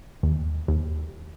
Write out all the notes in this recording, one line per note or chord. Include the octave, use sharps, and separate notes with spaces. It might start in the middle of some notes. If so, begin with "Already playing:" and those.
D#2
D#2